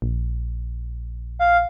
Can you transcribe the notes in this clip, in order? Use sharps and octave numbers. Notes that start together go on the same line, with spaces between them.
A#1
F5